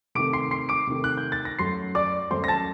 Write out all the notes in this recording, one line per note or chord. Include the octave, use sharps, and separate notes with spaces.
C3 D#3 A3 D6 D7
C6 C7
C6 C7
D6 D7
C3 D#3 A3
F#6
G6
A6
A#6
F#2 F#3 A3 C6 C7
D5 D6
F#2 F#3 A3 C5 C6
A#6
A5 A6